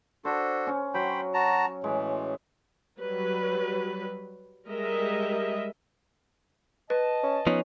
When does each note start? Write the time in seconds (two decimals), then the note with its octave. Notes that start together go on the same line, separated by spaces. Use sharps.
0.25 D4 F#4 A4 C5
0.67 C#4
0.94 F#3 C5 G5 B5
1.34 F#4 A5 A#5
1.84 A2 E3 G#3
2.98 F#3 G3 B4
4.67 G3 G#3 A#4 D#5 E5
6.90 B4 D#5 A5
7.23 C#4
7.47 F3 B3 C#4 D#4